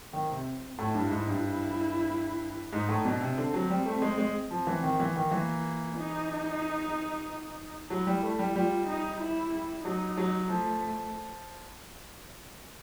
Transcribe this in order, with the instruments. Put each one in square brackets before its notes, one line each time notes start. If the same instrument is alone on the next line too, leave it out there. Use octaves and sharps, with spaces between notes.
[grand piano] D#3 [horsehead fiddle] C4
[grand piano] C3
[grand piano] A2 [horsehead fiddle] E4
[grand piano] G2
G#2
G2
[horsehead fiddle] E4
[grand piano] G#2 [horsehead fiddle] D#4
[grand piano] A2
[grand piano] B2 [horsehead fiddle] D4
[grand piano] C3
[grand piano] D3 [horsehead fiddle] C4
[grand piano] F#3
G3
A3
G#3
G#3
F3
[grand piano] E3 [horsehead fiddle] C4
[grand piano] D#3
[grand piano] E3 [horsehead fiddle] B3
[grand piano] D#3
[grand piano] E3 [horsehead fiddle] A#3
[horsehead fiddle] D#4
[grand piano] F#3 [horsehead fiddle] E4
[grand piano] G3
A3
G3
[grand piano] G3 [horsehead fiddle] F4
[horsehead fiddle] D#4
E4
[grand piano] F#3 [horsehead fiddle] D#4
[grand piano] F#3
[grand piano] F3 [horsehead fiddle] A3